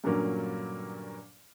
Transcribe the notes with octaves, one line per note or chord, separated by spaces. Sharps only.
G2 A#2 D3 F#3 A#3 C#4